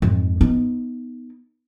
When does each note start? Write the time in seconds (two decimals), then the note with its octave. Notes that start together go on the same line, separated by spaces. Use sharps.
0.02 F2 G#2
0.41 B3 D#4